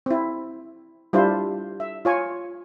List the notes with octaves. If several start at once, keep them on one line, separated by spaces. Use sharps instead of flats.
C4 E4
G3 D4 E4 F4 C5
E5
F4 C#5 G#5